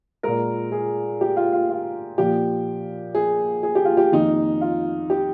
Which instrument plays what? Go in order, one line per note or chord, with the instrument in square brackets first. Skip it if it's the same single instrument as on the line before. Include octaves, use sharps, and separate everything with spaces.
[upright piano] A#2 G#3 A#4
G#4
G4
F4
F4
F4
A#2 F3 A#3 G4
G#4
G#4
G4
F4
G4
F2 D#3 A#3 D#4
F4
G4